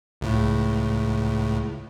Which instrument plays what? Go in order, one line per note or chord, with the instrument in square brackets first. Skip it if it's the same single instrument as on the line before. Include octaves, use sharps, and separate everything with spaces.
[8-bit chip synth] C#2 A2